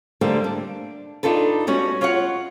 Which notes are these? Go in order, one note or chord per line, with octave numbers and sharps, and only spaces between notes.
D3 G3 A3 A#3 C4
D4
D4 D#4 F4 A4 B4
G3 B3 C#4 F#4
F4 C#5 D#5 F5 F#5